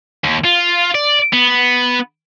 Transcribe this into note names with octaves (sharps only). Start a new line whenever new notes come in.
D#2
F4
D5
B3